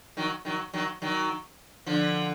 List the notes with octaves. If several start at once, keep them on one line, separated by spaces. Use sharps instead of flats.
D#3 F#3
D#3 F#3
D#3 F#3
D#3 F#3
D3 F3